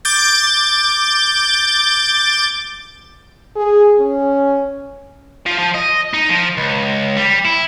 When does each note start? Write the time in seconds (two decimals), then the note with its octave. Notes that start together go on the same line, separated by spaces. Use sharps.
0.05 D6 G6 A6
3.56 G#4
3.99 C#4
5.46 F3
5.58 F3
5.74 D#5
6.14 D#4
6.29 F3
6.57 C#2
7.16 G3
7.45 E4